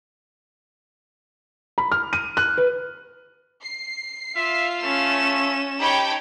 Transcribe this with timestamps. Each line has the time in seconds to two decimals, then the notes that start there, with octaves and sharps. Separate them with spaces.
1.78 B5
1.92 F6
2.13 D#7
2.37 F#6
2.58 B4
3.63 C7
4.36 F4 E5 F5
4.83 A3 C#4 E7
5.80 D#4 G4 C#5 G5 A5 B5